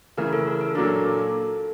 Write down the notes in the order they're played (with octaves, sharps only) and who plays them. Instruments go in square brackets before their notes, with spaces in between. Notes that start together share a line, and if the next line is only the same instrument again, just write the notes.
[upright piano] C#3 E3 A3 [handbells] A#4
[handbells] A4
A#4
A4
[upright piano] A#2 F#3 A#3 D4 [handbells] A4